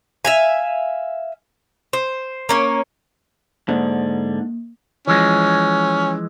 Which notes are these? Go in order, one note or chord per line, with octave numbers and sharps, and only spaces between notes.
E5 F5 G#5
C5
A#3 C#4 C#5
G#2 D3 A#3
E3 F3 G#3 C#4